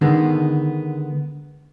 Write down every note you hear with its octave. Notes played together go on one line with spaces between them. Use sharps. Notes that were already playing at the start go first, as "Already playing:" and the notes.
D3 D#3 G#3 B3